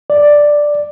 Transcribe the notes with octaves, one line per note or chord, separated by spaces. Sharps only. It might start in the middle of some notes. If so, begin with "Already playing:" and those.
D5